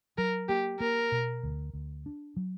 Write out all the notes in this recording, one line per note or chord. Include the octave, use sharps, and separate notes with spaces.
F#3 A#4
A#3 G4
A#3 A#4
B2
D2
D2
D4
F#3